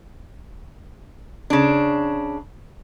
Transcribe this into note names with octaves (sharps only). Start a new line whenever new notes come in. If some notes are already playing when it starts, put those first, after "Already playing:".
C#3 D4